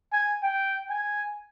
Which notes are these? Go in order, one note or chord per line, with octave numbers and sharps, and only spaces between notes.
G#5
G5
G#5